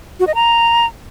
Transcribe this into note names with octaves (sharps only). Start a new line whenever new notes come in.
F#4
D#5
A#5